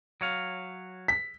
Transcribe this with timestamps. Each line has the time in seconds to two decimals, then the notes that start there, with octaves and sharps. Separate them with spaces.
0.21 F#3 C#5 F5
1.08 B6